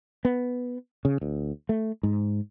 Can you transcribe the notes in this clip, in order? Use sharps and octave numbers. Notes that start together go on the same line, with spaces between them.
B3
C#3
D2
A3
G#2